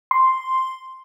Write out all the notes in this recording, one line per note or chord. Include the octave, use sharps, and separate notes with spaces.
C6